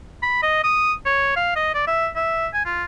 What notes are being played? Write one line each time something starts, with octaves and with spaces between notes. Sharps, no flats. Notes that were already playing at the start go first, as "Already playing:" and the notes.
B5
D#5
D#6
C#5
F5
D#5
D5
E5
E5
G#5
F4